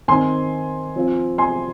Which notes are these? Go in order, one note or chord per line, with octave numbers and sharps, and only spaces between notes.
D#3 C4 D#4 G#5 C6
F3 C4 F4
G#5 C6